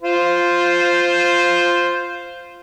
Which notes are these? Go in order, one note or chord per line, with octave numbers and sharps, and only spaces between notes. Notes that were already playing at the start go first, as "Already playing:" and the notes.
F4 C5